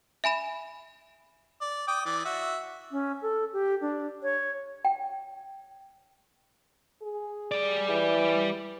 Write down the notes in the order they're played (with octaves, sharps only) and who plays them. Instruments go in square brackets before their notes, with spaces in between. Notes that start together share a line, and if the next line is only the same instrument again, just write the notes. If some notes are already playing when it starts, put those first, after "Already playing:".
[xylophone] E5 G#5 B5 E7
[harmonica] D5
G5 D6 D#6
E3 D5 D6
F#4 E5
[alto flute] C#4
A4
G4
D4
C#5
[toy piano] G5
[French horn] G#4
[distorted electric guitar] G3 D5
[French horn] E3